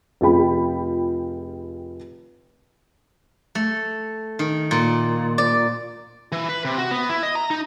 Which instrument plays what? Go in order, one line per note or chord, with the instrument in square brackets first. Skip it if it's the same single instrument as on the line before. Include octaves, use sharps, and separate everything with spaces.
[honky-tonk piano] F1 F4 G#4 G5 B5
[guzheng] A3
D#3
A#2
D5
[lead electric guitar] E3
B4
C3
F#4
B3
E4
D#5
A#5
D#4